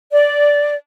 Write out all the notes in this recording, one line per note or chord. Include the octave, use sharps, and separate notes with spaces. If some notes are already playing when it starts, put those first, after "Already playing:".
D5